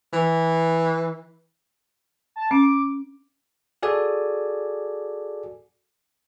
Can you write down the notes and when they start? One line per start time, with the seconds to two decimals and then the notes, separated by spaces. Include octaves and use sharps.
0.13 E3
2.36 A5
2.51 C#4 D6
3.83 F#4 G#4 A4 D5 G#5